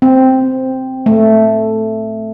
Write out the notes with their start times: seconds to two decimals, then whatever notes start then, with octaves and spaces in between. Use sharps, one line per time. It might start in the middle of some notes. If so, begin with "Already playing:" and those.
0.02 C4
1.06 A3